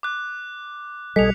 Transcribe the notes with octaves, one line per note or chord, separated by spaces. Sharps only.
D6 F#6
B1 G3 A4 D#5 G#5 B6 C#7 F7